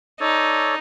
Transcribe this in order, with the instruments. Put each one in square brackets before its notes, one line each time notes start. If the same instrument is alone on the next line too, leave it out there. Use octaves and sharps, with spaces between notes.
[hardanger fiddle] D#4 [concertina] A4 C#5 D5